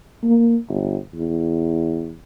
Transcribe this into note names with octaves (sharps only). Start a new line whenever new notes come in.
A#3
G1
E2